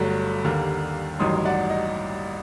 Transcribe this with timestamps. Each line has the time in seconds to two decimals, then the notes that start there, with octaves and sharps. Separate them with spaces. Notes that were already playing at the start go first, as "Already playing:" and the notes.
Already playing: G1 G2 F#3 A3
0.44 D#2 D3 G3 A#3
1.19 A1 G2 D#3 F#3 C6 D#6
1.45 D5 F#5
1.70 D#5